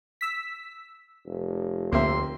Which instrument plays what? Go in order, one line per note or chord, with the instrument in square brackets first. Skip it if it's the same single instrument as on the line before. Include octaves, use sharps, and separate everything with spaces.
[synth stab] E6 B6
[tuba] F1
[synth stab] D2 [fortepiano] A#3 C4 E5 [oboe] C6